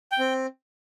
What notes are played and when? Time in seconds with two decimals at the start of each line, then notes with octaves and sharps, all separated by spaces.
0.12 G5
0.19 C4